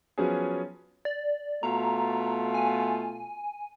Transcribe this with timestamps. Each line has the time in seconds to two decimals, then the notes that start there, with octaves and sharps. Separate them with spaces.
0.18 F3 F#3 B3 C#4 F#4 G#4
1.05 D5
1.63 B2 A3 F4 A#5
2.54 G#5